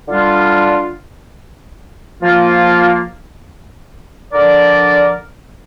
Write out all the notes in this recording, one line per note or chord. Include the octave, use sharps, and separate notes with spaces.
D3 G3 D4 F4
F3 A#3 F4
D3 F3 D4 A#4 D5